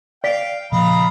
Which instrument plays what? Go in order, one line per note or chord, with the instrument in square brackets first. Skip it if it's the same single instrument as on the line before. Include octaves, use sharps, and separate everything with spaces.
[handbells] D5 B6 [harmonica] F5 G5
[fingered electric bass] A#2 C#3 F3 [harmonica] D#5 F5 A#5 [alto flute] B5